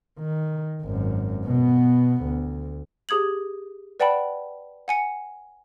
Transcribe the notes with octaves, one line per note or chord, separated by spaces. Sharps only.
D#3
G#1 F#2
B2 B3
D2
G4 G#4 D#6 G#6 F#7
B4 D5 F#5 G5 A5 B5
F#5 G#5 C#7